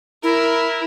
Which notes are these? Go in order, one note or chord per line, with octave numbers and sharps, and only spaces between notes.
E4 A#4